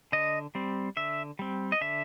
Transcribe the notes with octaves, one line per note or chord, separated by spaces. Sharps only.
D3 D#5
G3 C4
D3 E5
G3 C4
D#5
D3 E5